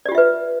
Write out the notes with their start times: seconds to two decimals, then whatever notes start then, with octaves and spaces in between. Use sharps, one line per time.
0.06 D5
0.09 G4
0.12 F4
0.15 E5
0.18 B4